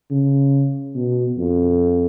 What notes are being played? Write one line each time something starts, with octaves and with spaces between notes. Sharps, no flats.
C#3
B2
F2